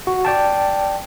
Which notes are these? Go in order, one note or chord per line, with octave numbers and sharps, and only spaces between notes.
F#4
D5 G5 A5